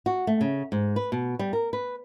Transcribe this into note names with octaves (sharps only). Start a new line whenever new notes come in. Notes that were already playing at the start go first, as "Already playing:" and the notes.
F#4
A3
C#3
G#2
B4
B2
G3
A#4
B4